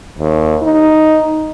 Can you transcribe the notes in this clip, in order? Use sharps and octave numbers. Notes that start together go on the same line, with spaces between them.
D#2
D#4